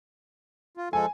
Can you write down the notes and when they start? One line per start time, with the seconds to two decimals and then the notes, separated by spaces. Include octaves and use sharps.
0.77 F4
0.93 F3 G#3 A4 G#5